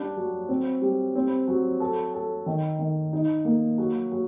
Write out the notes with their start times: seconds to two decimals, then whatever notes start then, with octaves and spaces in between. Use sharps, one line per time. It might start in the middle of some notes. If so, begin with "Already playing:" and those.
Already playing: G3 D4
0.17 F#3
0.49 C4
0.82 G3
1.15 C4
1.48 F#3
1.80 A4
2.14 A4
2.46 D#3
2.79 D#3
3.13 D#4
3.45 A#3
3.78 F#3
4.12 F#3